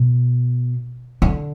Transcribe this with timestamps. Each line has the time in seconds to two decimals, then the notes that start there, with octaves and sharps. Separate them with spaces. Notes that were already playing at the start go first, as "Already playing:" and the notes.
Already playing: B2
1.22 D3